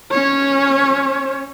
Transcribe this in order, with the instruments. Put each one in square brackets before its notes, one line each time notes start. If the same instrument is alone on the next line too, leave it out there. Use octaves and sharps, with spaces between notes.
[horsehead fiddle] C#4 C#5